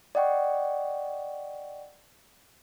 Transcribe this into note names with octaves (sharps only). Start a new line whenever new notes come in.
D5 D#5 F#5 G5 C#6